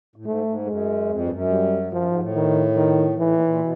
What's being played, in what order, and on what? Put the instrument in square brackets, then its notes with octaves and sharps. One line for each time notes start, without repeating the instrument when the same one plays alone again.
[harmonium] A2
[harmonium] G#2 [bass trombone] A3
[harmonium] G#2
[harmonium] F#2 [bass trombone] G#3
[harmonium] F2
G2
F#2
[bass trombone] G3
[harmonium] F#2 [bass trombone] F3
[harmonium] G#2
A2
[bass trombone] D#3
D#3
[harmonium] A2 [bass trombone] E3
[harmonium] A#2
A#2
B2